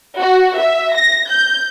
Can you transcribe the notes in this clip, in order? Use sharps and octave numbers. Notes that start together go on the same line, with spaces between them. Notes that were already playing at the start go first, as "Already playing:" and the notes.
F#4
E5
A#6
G6